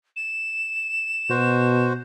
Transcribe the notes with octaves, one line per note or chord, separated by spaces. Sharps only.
E7
B2 F#4 C5